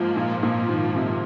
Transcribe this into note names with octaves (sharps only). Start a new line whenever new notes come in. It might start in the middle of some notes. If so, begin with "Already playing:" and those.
Already playing: G#2 F3 A#3
A#2
A#2
D#3
C3